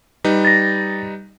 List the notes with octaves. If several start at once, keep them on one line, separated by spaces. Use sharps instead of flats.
G3 D#4 B4
A6 A#6